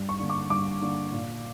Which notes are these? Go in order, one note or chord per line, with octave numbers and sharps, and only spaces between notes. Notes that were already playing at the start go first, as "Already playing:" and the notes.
Already playing: G2
C#6
D3 A#3 D4
D6
G2 D6
D3 A#3 D4
A#2